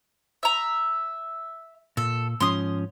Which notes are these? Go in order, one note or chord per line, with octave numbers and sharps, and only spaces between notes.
E5 A#5
A#2 A4
G#2 F3 C#4 C6 D#6